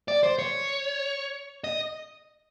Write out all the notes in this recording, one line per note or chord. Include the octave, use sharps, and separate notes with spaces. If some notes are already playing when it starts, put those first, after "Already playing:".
D5
C5
C#5
D#5